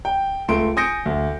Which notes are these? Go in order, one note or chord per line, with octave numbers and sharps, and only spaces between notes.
G5
C#2 A3 C6 D7
G#5 D#6 G6 A#6 C#7 D7
D2